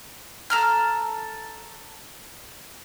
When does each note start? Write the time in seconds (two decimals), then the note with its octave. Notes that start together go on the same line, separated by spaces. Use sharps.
0.50 A4 A#5 F6